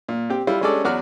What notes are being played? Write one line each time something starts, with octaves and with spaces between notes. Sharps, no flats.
A#2
C4 G4
G3 E4 F4
G3 G#3 C#4 D4 A4 D5
E2 F#3 F#4 D5 F6